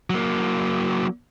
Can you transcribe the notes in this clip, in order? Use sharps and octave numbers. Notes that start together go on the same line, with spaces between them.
F#3 A#3